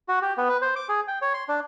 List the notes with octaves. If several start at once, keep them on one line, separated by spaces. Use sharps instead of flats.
F#4
G4
B3
B4
C5
D6
G#4
G5
C#5
C6
D4